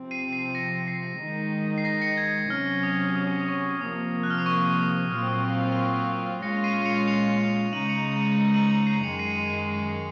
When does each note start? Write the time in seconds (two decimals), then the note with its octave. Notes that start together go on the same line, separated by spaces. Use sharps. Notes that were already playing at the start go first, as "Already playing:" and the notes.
Already playing: C3 F3 C4
0.11 C7 D#7
0.33 C7 D#7
0.55 A#6 C#7
0.87 C7
1.20 D#3 G#3 D#4
1.78 C7
1.85 A#6
2.02 A#6 C#7
2.17 G#6
2.50 C3 F#3 C#4 F6
2.83 D#6
3.16 D#6
3.40 D#6
3.48 C#6
3.80 C3 F3 A#3 D#6
4.23 F#6
4.30 F6
4.38 D#6
4.46 C#6
4.79 D#6
5.12 A#2 F#3 C4 F4 F6
5.28 D#6
5.45 C#6
5.61 D#6
5.77 C#6
5.93 C#6
6.09 D#6
6.26 F6
6.42 A#2 G#3 C#4 F4 A#6 C#7
6.64 C7 D#7
6.86 C#7 F7
7.07 C#7 F7
7.73 C#3 G#3 D#4 D#7 F#7
7.89 C#7 F7
8.05 C#7 F7
8.17 D#7
8.21 C#7 F7
8.38 C#7 F7
8.54 D#7 F#7
8.71 C#7 F7
8.87 C7 D#7
9.03 F#2 D#3 G#3 C#7 F7
9.19 C7 D#7
9.30 D#7